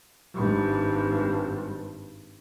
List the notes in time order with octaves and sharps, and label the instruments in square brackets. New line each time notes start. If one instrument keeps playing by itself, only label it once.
[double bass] G#1 G2